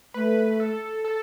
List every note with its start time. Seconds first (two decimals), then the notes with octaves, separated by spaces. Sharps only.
0.14 A3 B4
0.60 A4
1.04 A4